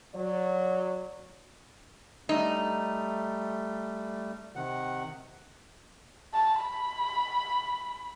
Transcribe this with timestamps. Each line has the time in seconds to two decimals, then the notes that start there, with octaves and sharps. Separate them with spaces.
0.15 F#3 D5
2.29 G3 A3 D#4
4.56 C3 D#3 F#5
6.34 A5
6.62 B5